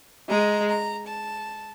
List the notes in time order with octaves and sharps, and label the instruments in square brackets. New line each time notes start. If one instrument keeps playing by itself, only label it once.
[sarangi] G#3 [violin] A#5
[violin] A#5
A5